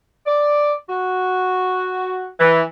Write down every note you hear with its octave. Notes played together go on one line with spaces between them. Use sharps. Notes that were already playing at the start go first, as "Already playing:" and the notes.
D5
F#4
E3